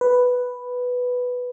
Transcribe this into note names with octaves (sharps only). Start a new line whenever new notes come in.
B4